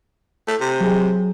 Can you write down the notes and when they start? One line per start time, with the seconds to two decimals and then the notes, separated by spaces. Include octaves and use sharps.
0.48 A3
0.61 C3
0.81 F#3 G#4